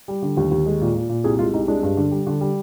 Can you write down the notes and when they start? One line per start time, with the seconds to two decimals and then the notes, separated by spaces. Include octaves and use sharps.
0.08 G3
0.22 D3
0.37 D#2
0.51 D#2
0.66 G#3
0.81 A#2
0.95 A#2
1.09 A#2
1.24 C2 G#4
1.39 G#3 F4
1.54 C2 D#4
1.68 G#3 D4
1.83 G2
1.97 D3
2.11 G3
2.27 D3
2.41 G3